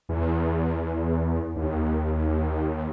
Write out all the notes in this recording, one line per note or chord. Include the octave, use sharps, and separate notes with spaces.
E2
D#2